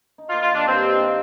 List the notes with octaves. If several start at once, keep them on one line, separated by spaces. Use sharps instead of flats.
D#4
F4
A#3
F4
D#3 D4
G2 C4
D#4
A#3